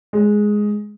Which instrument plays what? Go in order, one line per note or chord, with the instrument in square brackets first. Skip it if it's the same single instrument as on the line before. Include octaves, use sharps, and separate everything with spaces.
[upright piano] G#3